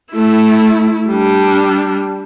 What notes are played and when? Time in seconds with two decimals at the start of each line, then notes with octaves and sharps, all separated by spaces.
0.13 A3 E4
1.09 G3 D4